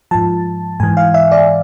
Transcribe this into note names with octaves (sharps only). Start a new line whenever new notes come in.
G#2 F3 A5
G#2 E3 G#5
F5
E5
D5